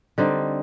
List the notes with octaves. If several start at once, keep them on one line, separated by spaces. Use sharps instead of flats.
D3 G3 C4 D#4